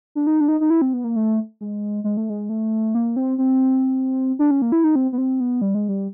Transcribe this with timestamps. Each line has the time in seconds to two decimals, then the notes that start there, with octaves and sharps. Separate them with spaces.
0.15 D4
0.27 D#4
0.41 D4
0.48 D#4
0.61 D#4
0.70 E4
0.82 C4
0.93 B3
1.04 A#3
1.16 A3
1.61 G#3
2.04 G#3
2.17 A3
2.30 G#3
2.49 A3
2.95 A#3
3.16 C4
3.38 C4
4.39 D4
4.51 C#4
4.62 A#3
4.72 E4
4.84 D#4
4.95 C4
5.13 B3
5.18 C4
5.40 B3
5.62 G3
5.75 G#3
5.89 G3